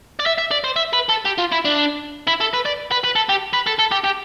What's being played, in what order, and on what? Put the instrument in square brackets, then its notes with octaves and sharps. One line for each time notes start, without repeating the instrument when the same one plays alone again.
[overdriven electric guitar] D5
E5
E5
D5
C5
E5
B4
A4
G4
F4
E4
D4
E4
A4
B4
D5
B4
B4
A4
G4
B4
A4
A4
G4
G4